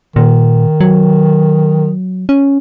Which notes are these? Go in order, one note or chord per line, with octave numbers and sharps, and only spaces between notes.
A#2 D#3
F#3
C#4